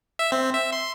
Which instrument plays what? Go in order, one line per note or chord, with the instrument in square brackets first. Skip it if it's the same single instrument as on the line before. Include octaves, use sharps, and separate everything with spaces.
[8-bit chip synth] E5
C4
E5
C6